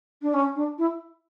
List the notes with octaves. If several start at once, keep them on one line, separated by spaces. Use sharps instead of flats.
D4
C#4
D4
E4